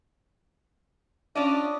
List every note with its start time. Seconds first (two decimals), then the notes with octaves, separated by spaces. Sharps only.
1.35 C#4 D4 F4 D#5